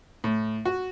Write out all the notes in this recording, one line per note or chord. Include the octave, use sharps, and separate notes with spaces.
A2
F#4